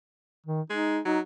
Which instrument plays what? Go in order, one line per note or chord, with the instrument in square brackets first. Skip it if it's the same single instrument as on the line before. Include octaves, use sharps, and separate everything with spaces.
[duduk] D#3
[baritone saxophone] G#3 [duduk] D#4
[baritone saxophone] F#3 [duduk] D#4